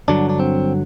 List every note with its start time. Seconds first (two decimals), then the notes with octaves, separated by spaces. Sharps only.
0.08 G2 D3 F#3 D4
0.29 D4
0.40 C4